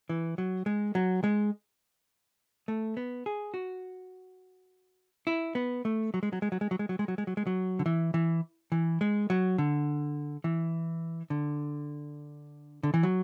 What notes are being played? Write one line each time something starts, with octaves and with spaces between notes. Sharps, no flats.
E3
F#3
G#3
F#3
G#3
A3
B3
G#4
F#4
E4
B3
A3
F#3
G#3
F#3
G#3
F#3
G#3
F#3
G#3
F#3
G#3
F#3
G#3
F#3
G#3
F#3
D3
E3
E3
E3
G#3
F#3
D3
E3
D3
D3
E3
F#3